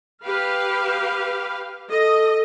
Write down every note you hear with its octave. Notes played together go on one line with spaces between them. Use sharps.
G4 B4 F5
A4 D#5